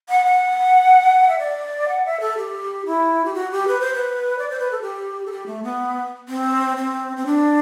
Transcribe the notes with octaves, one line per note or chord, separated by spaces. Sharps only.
F#5
F#5
E5
D5
F#5
E5
A4
G4
E4
G4
F#4
G4
B4
C5
B4
D5
C5
B4
A4
G4
A4
G4
A3
B3
C4
C4
C4
D4